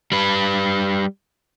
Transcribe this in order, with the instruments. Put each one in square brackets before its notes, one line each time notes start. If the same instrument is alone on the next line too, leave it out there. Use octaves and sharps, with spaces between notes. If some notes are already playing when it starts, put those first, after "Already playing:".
[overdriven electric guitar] G3 B4